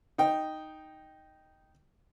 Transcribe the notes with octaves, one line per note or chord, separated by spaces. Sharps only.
D#4 G5